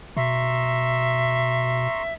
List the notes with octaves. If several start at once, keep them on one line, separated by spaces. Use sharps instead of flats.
B2 E5 A#5 C6 C#6